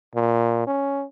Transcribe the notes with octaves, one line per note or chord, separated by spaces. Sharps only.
A#2
C#4